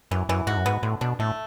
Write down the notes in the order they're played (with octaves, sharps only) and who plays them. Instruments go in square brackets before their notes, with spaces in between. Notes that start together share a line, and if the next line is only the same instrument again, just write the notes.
[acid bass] F#2 [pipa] E3
[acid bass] F#2 [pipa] E3
[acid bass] G#2 [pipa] F#4
[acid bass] F#2
[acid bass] G#2 [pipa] B3
[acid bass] A2 [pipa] D3
[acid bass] B2 [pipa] D4
[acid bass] A2 [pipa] A3